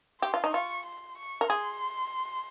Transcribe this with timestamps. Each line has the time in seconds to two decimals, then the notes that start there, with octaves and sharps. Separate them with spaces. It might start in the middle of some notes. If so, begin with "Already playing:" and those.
0.22 G4 C6
0.34 F4
0.44 D#4
0.54 F4 C#6
0.86 C6
1.18 C#6
1.41 A#4
1.50 G#4 C6